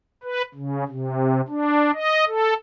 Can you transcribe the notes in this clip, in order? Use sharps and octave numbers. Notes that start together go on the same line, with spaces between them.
B4
C#3
C3
D4
D#5
A4